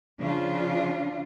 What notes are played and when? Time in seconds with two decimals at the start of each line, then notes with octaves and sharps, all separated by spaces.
0.21 C#3 F3 D4 F4